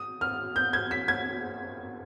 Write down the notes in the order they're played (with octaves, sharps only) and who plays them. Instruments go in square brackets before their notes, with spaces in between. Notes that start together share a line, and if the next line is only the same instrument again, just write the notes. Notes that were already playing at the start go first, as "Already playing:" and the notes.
Already playing: [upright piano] D#6
F6
G6
G#6
B6
G#6